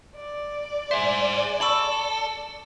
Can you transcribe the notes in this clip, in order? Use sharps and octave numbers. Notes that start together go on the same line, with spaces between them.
D5
G#4 C5 E5
A4 B5 C#6 E6